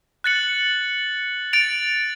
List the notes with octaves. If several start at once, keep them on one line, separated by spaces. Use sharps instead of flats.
F#6 A6 C#7 F#7
A6 D7 F7